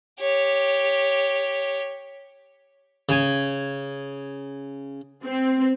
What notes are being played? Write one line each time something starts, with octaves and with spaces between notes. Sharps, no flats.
G4 C#5
C#3 G#5
C4